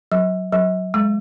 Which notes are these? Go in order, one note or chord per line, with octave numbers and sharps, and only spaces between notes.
F#3
F#3
G#3